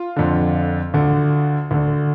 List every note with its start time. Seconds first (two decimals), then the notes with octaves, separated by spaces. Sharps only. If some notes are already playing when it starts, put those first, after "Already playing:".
Already playing: F4
0.16 F2 D3
0.94 D2 D3
1.71 D2 D3